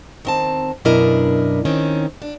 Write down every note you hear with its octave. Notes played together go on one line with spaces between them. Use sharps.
D#3 C4 A5
F#2 B2 D4 E4 A#4 D#5
D#3 C4 C#4
D4